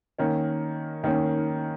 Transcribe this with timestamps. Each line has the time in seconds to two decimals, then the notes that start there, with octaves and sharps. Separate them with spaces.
0.18 D#3 A#3 C#4
1.04 D#3 A#3 C#4